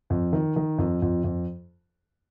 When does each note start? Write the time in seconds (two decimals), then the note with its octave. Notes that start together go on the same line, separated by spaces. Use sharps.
0.10 F2
0.33 D#3
0.56 D#3
0.78 F2
1.02 F2
1.24 F2